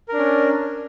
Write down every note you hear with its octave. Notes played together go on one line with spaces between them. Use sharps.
C#4 D4 A#4